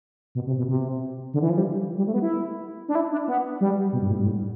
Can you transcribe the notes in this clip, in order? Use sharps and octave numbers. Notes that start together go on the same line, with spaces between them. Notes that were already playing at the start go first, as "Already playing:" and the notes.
B2
C3
B2
C3
D3
E3
F3
G3
G3
A3
B3
E4
D4
E4
D4
B3
G3
B2
G2
A2
G2
A2